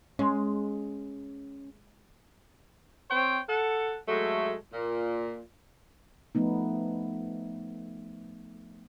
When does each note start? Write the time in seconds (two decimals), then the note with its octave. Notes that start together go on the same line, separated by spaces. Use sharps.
0.19 G#3 C#4
3.10 C4 C5 C#5 G5
3.49 A4 F#5
4.07 F#3 G#3 A3
4.73 A#2
6.35 F3 A3 B3 D#4